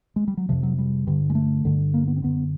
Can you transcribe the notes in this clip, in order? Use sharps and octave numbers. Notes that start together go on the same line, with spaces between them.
G#3
G3
F#3
F2 C3 F3
F#3
G3
G2 D3
G#3
A3
G2 D3
A#3
B3
C4
F#2 D3 B3